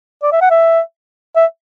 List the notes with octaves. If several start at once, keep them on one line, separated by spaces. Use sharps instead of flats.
D5
E5
F#5
E5
E5